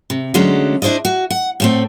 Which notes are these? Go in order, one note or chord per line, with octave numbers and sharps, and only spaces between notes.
C3
D3 F#3 G#3 A3 C#4 D4
D4 E4 C5 D5 D#5
F#4
F#5
A2 A3 C4